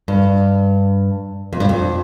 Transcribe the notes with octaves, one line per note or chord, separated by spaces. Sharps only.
G2
F2
G2
F2